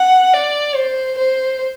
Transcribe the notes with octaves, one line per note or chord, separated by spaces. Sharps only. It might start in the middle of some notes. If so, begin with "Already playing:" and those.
Already playing: F#5
D5
C5
C5